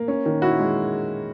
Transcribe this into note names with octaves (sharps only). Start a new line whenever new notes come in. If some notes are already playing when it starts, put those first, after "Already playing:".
Already playing: A#3
C#4
D#3
E4 F#4
G#3